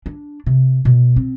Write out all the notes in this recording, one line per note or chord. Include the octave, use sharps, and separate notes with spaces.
D4
C3
B2
C4